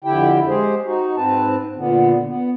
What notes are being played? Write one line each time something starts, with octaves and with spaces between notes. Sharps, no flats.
F2 D3 E4 G4 G5
G#3 G4 G#4 C5
D#4 F#4
G#2 C4 B4 A5
A#2 D3 B3
B3